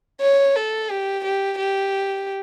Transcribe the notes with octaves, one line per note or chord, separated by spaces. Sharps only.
C#5
A4
G4
G4
G4